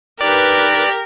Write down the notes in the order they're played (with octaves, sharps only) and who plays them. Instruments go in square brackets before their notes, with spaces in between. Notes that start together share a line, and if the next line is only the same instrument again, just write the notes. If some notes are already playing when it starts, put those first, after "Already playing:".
[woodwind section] D4 D#4 B4 [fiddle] G4 [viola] A#4 [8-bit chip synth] D5